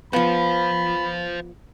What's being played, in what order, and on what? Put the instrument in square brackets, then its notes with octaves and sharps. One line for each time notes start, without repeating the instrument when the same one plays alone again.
[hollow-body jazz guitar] F3 B3 [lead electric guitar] C5 F5 [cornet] B5